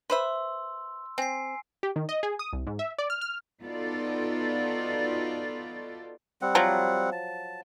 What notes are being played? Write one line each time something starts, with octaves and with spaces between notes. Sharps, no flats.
B4 C5 E5 C6 E6
C4 G#5 C7
G4
D#3
D#5
G#4
D#6
C2
G#2
E5
D5
F6
F6
B3 D#4 F4 F#4 A4 D5
G3 C4 F#5
F3 F#3
A5